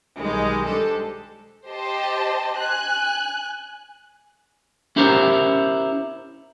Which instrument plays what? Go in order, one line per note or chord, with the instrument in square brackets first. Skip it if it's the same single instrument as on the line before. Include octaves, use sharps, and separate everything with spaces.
[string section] B1 D#3 G3 G#3 A#5
G#3 D4 G4 A4 C5
[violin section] G4 C5 D#5 A5
G#5 F#6
[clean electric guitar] C#4 E4 G4 A#4 C5 C#5